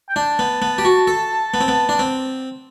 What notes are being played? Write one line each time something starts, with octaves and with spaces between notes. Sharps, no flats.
G5
D4 A5
B3
B3
G4
F#4
A4
B3
C4
B3
D4
C4